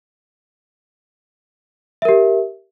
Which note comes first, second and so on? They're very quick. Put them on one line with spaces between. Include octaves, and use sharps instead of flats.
E5 A#4 G4